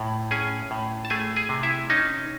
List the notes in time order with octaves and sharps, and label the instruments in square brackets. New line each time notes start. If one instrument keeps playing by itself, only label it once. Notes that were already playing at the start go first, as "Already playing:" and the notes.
Already playing: [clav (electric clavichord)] A2
C#4 G#4 G#5
A2
A5
A3 G#4 G#5
G#4 G#5
C3
E4 E5
C#4 D#4 D#5